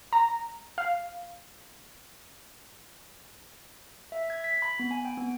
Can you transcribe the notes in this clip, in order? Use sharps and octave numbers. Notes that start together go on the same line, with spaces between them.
A#5
F5
E5
G#6
B6
B5
B3
G#5
G5
B3